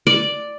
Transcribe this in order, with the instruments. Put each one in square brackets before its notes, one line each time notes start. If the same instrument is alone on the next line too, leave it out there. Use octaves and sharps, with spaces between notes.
[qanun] D5